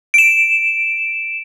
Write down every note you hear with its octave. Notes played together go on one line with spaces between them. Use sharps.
D7 E7